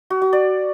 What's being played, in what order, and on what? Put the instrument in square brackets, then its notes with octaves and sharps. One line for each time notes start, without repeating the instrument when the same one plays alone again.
[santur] F#4
F#4
D5